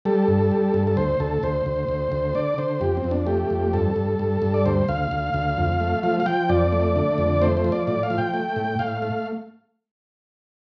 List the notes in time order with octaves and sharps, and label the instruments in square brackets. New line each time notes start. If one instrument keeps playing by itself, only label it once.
[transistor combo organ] G3 A4
G2
G3
G2
A4
D2 C5
D2 A4
D2 C5
D2
D2
D2
D3 D5
D3 C5
F2 G4
C4
F2
D4
A3 G4
F2
G2 A4
G2
G2
G2
D5
D2 C5
D2 F5
D2
D2
F2
A3
F3 F5
F5
F3 G5
F2 D5
A3
D3
F2
A3 C5
C5
F3
D5
A2 D5
F5
F3
G5
A3
A2
A2 F5
A3